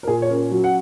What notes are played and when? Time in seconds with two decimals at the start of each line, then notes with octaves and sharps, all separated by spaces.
0.03 A#4
0.07 A#2 G#4
0.22 C#5
0.29 C#4 A#4
0.51 F#3
0.64 F#5